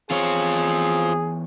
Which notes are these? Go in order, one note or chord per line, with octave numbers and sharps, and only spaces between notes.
E2 C4 F4 G#4 C#5